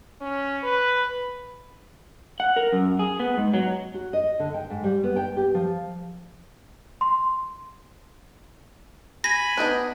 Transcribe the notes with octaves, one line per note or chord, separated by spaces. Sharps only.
C#4
B4
F#5
A#4
F#2
G#4
B3
G#2
F#3
F#4
D#5
D3
G5
G#2
G3
B3
G5
G4
F3
C6
G#5 B5 A#6
B3 D4 D#4 G#4